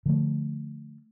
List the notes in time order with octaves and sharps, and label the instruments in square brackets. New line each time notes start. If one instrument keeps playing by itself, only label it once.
[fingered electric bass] D3 F3 A3